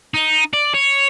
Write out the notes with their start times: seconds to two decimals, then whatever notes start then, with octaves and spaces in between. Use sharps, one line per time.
0.14 D#4
0.53 D5
0.74 C#5